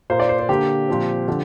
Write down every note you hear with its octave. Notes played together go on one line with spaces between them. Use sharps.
A#2 A#3 C5
D5
C5
C5
D3 A#3 G4
A#2 F3 C4
D3 F3